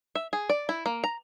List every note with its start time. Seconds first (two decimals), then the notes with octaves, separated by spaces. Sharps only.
0.15 E5
0.33 G#4
0.49 D5
0.69 E4
0.86 A#3
1.04 A#5